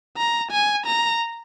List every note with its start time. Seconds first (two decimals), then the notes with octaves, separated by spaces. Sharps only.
0.17 A#5
0.52 G#5
0.86 A#5